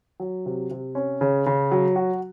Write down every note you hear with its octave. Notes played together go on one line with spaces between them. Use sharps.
F#3
C3
C3
C#4
C#3
C#3
F#3
F#4